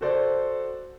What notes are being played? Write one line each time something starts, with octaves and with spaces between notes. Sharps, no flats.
F#4 A4 C5 D5